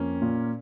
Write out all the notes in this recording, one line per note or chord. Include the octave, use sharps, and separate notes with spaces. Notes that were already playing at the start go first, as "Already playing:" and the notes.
Already playing: F2 A#3 C#4
A#2